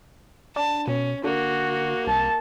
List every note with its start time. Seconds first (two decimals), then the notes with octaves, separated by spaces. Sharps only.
0.56 D4 A5
0.87 B2 C#4
1.24 D3 A#3 F#4
2.07 C2 A5